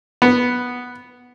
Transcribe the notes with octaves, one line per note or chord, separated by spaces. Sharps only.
B3